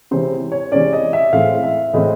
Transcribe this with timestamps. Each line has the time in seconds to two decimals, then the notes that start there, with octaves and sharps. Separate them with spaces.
0.11 C3 E3 G#3 C#4 C5
0.52 C#5
0.72 C3 E3 G#3 C#4 D5
0.93 D#5
1.13 E5
1.33 A2 E3 G#3 C4 F5
1.63 E5
1.93 A2 E3 G#3 C4 D#5